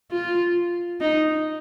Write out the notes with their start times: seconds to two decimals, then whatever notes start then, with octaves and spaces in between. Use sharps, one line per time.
0.11 F4
1.01 D#4